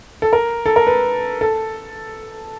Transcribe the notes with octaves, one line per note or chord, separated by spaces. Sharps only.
A4
A#4
A4
A#4
B4
A4